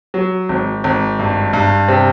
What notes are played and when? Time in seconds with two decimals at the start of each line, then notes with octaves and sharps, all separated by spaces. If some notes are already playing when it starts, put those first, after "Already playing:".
0.14 F#3
0.49 G#1
0.84 G#1
1.19 G2
1.53 G2
1.88 C3